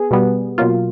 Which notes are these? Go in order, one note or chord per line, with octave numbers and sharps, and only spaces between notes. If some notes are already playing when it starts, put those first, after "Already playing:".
Already playing: B3 G#4
B2 G3 B3
B2 F#3 A#3 F4